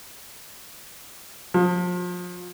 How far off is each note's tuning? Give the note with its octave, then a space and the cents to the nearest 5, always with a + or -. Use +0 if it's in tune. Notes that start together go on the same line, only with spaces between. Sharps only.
F3 +35